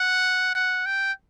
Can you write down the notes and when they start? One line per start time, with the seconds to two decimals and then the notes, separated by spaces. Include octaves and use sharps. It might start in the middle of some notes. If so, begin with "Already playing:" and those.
Already playing: F#5
0.55 F#5
0.86 G5